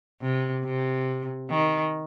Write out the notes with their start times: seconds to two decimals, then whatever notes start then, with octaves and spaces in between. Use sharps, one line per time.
0.22 C3
0.65 C3
1.50 D#3